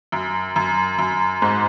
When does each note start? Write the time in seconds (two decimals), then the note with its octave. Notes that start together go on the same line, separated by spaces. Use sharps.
0.12 F#2
0.56 F#2
0.98 F#2
1.42 G#2